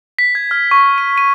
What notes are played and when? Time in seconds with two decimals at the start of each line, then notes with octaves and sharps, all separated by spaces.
0.19 B6
0.35 G#6
0.51 F6
0.71 C#6
0.98 D#7
1.18 D#7